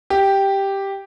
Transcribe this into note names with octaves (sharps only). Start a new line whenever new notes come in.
G4